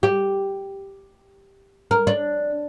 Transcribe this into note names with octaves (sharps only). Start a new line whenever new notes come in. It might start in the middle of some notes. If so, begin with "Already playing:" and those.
G4
A#4
D4